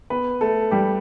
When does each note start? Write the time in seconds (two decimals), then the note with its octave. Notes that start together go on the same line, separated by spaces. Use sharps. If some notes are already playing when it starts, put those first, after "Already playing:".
0.10 B3 B4
0.41 A3 A4
0.71 G3 G4